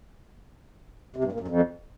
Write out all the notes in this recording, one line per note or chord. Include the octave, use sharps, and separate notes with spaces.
C3
G2
A#2
F#2
F2